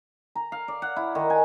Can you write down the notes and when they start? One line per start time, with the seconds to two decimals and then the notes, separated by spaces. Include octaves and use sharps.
0.35 A#5
0.52 F5
0.68 D5
0.82 F#5
0.96 E4
1.15 D#3
1.30 G#5